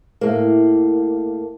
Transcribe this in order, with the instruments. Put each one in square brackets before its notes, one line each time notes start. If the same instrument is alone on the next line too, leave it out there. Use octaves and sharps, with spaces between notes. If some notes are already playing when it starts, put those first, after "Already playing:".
[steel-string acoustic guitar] A2 A#3